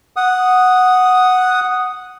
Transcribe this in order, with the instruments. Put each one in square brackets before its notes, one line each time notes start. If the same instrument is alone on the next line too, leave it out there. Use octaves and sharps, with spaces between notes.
[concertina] F#5 D#6